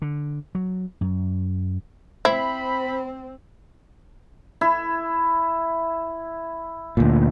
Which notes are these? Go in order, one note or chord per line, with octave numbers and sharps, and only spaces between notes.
D3
F#3
F#2
C4 E4 C5 B5
E4
D2 A#2